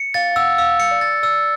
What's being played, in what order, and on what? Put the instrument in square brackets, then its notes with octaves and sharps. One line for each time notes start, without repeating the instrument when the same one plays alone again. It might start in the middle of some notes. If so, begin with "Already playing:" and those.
Already playing: [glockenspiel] C#7
[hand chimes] F5 [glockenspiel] A6
[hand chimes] F5
[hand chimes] F#5 [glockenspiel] E6
[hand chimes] F5 [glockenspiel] E6
[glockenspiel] C#7
[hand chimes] D5
[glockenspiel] A6
[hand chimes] D5 [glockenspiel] E6